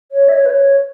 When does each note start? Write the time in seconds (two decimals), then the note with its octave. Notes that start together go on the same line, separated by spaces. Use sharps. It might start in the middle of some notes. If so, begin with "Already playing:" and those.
0.12 C#5
0.29 E5
0.33 C#5
0.46 B4
0.50 C#5